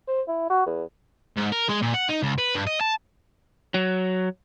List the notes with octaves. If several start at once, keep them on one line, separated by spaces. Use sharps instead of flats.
C5
E4
F#4
E2
G#2
A#4
G#3
A#2
F#5
D#4
C#2
B4
G2
D#5
A5
F#3